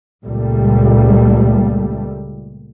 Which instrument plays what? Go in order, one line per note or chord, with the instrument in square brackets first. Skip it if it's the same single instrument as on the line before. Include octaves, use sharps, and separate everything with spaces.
[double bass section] C#2 A#2 G3 A3